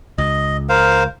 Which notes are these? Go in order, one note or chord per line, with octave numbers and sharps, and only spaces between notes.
C#2 D#5
A#4 C5 F5